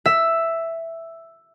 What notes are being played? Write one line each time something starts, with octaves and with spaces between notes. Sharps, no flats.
E5